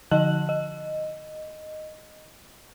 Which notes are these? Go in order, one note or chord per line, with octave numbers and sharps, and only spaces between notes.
D3 F3 D#5 A5 F#6 F#7
D#5